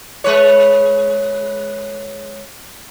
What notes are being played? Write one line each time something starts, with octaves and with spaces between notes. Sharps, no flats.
G#3 B4 C#5